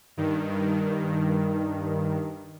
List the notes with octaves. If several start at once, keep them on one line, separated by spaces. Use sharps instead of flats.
G2 D#3